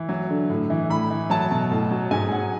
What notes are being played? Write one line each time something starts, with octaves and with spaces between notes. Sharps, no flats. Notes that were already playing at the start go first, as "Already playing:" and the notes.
Already playing: E3
F#3
D3
A2
E3
A2 B5
E3
F#3 A5
B2
A2
F#3
G#2 G#5
F#3 F#5